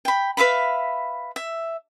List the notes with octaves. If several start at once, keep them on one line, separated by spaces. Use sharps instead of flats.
G5 B5
B4 E5 F5 B5
E5